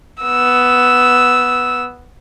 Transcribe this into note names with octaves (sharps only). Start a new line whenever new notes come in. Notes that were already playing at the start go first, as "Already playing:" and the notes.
B3 E6